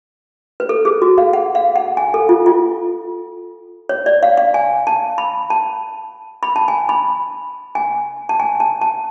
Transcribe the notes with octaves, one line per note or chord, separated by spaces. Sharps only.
B4
A4
G#4
F#4
F5
F#5
F5
F#5
G#5
A4
F4
F4
C#5
D5
F5
F5
G#5
A5
B5
A5
B5
A5
G#5
B5
G#5
A5
G#5
A5
A5